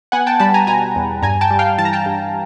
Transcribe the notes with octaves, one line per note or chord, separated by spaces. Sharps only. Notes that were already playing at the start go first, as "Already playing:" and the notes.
B3 F#5 G#5
G5 A5
G3 A5 B5
G#5 A#5
B2 G#5 A#5
E2
G2 G#5 A#5
G5 A5
G3
F5 G5
E3 A5
A#5
G5 A5
G2